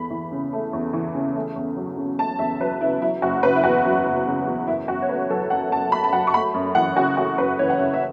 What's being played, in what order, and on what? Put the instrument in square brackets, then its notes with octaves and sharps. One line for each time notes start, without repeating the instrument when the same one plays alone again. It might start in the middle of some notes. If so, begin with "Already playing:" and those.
Already playing: [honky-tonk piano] E2 A3 B5
E3
C#3
A3
E2
E3
C#3
A3
E2
F#3
C#3
A3 A5
E2 E5
F#3 B4
C#3 E4
F#3 E4
F#1 F#4
C#3 B4
E4
E2 F#4
F#3
F#1
C#3
E2
F#2 E4
F#2 F#4
C#5
A3 B4
F#3 A4
F#2 F#5
F#2 A5
A3 B5
A5
F#3 F#5
C#6
A3 B5
F#2
E3 F#5
C#3 F#4
A3 F#4
F#2 B4
E3 C#5
F#5
C#3 E5
E5